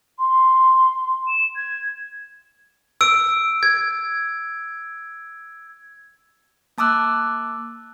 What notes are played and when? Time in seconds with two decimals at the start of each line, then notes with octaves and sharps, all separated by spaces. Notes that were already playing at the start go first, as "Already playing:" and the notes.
0.19 C6
1.28 E7
1.56 G#6
3.01 E6 D7
3.63 G#6
6.78 A#3 A5 D6 E6 F#6